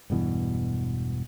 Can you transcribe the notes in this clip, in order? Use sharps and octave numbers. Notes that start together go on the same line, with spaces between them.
E1 G2 B2 E3